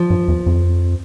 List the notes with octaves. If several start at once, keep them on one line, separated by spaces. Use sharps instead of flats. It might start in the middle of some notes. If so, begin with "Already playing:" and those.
Already playing: F3
G2
E2
F2